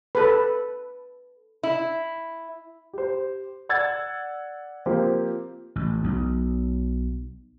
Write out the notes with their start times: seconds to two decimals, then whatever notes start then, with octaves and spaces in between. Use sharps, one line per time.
0.15 A4 B4
1.63 E4
2.93 G4 C5
3.69 D5 F#5 E6 G#6 A6
4.86 F3 A#3 C4 G4 C5
5.76 A1
6.04 B1